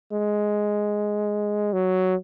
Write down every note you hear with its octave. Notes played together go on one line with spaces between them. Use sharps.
G#3
F#3